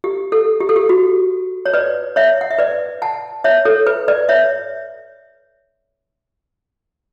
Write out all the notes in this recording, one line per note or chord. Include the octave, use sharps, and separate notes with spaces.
G4
A4
G4
A4
G4
F#4
C#5
B4 D5
C#5 E5
F#5
E5
B4 D5
F#5 A5
C#5 E5
A4 C#5
B4
B4 D5
C#5 E5